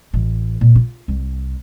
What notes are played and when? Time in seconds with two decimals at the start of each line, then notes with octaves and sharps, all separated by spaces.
0.13 A1
0.61 A#2
0.75 F4
1.08 C2